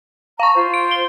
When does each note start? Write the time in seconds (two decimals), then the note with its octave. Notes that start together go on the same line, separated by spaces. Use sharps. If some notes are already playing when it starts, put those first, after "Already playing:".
0.40 F5 A5 A#5 C#6
0.55 F4 C5
0.74 D7
0.91 G7